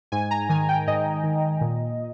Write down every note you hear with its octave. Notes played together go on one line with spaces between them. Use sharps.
G#2 G#5
A#5
D#3 G#5
G5
G#2 D#5
D#3
A#2